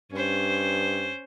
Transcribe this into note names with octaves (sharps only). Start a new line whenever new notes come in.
G2 C#4 C5